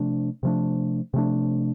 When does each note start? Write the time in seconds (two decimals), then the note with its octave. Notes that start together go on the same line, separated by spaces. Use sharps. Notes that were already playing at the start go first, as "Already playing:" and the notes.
Already playing: C3 F3 A3 D4
0.43 C3 F3 A3 D4
1.14 C3 F3 A3 D4